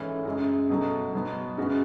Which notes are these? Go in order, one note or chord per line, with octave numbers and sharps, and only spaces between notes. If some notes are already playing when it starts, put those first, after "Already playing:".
Already playing: G#2 E3 A3 C#4 E4
F#2 C#3 G#3
B2 F#3 A3
B2 F#3 B3
F#2 C#3 G#3 B3 F#4